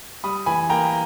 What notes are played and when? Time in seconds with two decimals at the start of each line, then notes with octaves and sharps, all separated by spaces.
0.24 G3 B5 D#6
0.46 E3 G#5 B5
0.69 A#3 G5 A#5